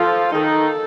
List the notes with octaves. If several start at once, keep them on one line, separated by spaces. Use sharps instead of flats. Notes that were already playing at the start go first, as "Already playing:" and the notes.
Already playing: F3 F4 A4
D#3 D#4 A4